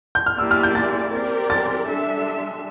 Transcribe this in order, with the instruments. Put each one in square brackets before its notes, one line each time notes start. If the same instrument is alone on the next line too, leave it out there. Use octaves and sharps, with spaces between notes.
[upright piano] G6
F6
[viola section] A#3 E4 G4 D5 [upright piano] E6
[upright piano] F6
G6
A6
[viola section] C4 G4 A#4 D5
[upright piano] A6
[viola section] G3 D4 A4 E5